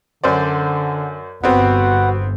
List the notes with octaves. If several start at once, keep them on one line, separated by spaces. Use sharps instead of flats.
F#2 D3 C5 D5
G1 B3 C4 F#4 B4 F#5